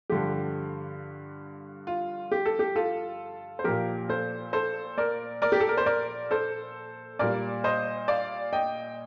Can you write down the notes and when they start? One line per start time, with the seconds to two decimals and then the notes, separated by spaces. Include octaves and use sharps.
0.10 G2 D3 F3 G4
1.87 F4
2.32 G4
2.46 A4
2.59 G4
2.76 F4 A4
3.59 C5
3.64 A#2 F3 G4 A#4
4.09 A4 C5
4.53 A4 C5
4.98 A#4 D5
5.42 A#4 D5
5.52 G4
5.60 A4
5.69 A#4
5.77 C5
5.86 A#4 D5
6.31 A4 C5
7.19 A#2 G3 A#4 D5
7.64 C5 D#5
8.08 D5 F5
8.53 D#5 G5